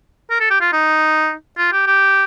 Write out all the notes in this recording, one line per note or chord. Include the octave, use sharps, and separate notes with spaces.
A#4
A4
G4
F4
D#4
F4
G4
G4